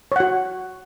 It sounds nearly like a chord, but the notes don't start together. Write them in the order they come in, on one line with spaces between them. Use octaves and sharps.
C#5 F#5 F#4